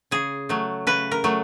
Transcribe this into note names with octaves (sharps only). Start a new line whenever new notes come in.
C#3 G#4
F#3 A3
C#3 B4
A#4
F#3 A3